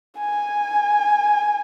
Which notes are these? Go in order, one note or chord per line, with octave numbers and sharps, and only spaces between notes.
G#5